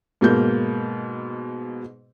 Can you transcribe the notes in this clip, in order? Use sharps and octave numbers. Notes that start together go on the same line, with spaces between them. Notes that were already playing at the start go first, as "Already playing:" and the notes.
G#2 B2 A#3 G6